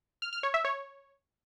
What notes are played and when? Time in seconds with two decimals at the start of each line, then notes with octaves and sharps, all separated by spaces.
0.22 F6
0.33 F6
0.43 C#5
0.54 E5
0.65 C#5